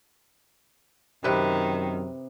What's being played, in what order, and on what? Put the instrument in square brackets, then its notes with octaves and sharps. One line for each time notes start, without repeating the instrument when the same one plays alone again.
[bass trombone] F#2 [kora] C3 B4 [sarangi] D#3